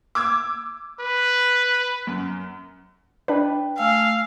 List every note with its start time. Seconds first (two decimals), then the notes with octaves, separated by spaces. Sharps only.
0.15 D6 E6 G#6
1.00 B4
2.07 F#2
3.28 D4 B4 G5
3.78 A3 F5 G#5 E6